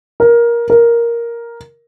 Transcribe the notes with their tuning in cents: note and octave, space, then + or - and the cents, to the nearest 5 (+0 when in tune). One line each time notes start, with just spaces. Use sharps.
A#4 +15
A#4 +5